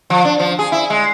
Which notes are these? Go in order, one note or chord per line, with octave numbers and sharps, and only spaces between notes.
F3
D4
F3
G#4
E4
G#3